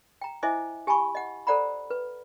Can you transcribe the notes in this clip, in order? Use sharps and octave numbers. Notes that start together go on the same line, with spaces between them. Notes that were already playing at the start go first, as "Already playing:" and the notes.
G5 A#5
E4 C5 D#5 E5 G#5 D6
G4 G#5 A5 B5 C#6
D#5 F#5
A4 C5 D5 F#5 A#5 B5
B4